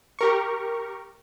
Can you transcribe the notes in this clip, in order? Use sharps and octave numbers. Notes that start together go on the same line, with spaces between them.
G4 A#4 C#6